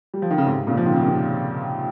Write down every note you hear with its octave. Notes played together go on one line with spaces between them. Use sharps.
G3
F3
D#3
C#3
G#2 C3
A#2 C#3
F3
D#3
C#3
C3 D#3